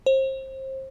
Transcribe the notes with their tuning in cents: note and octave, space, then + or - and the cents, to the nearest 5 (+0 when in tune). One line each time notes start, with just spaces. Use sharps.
C5 +30